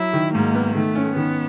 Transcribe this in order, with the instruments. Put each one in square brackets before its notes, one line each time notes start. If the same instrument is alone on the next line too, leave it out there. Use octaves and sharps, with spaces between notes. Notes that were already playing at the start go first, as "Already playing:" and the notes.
Already playing: [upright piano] F#3 [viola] E4
[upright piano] D#3
[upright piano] G#2 [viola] A#3
[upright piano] B3
[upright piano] D#3 [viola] A3
[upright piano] C#4
[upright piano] D#3 [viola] B3